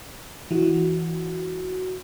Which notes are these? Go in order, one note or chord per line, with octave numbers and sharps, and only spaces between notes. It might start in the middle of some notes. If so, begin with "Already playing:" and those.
E3 F#4